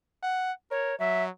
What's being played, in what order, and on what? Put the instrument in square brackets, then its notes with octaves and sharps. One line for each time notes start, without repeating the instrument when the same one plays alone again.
[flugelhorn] F#5
[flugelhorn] A#4 [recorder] C#5
[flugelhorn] F#3 [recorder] E5